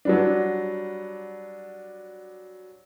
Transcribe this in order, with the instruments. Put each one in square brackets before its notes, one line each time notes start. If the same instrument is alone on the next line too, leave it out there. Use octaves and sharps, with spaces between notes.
[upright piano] F#3 G3 D4